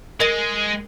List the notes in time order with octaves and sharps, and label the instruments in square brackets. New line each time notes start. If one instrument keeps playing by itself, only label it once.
[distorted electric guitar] G#3 [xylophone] A#4 D#5 A#6